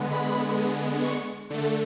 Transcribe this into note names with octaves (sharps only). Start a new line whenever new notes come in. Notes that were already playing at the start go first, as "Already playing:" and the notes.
Already playing: D3 G#3 B3
B5
C#6
D3 A3